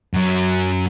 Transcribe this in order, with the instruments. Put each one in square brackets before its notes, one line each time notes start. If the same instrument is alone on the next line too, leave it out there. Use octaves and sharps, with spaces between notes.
[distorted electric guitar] F#2 F#3